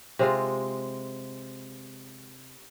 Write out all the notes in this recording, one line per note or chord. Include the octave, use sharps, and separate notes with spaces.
C3 G#3 F4